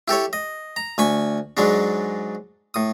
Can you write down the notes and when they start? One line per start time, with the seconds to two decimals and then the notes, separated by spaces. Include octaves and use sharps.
0.08 E4 G4 A4 C#5
0.33 D#5
0.76 A#5
0.98 D2 G#5 B5 C#6
1.57 G#2 F#3 G#3 D4
2.74 A2 D#6